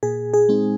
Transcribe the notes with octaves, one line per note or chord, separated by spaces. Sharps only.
A#2 G#4
G#4
G#3 C4 D#4